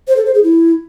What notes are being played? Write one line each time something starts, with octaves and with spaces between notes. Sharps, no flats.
C5
A4
C5
G#4
E4